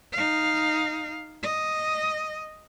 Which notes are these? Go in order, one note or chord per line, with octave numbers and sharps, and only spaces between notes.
D#4 F5
D#5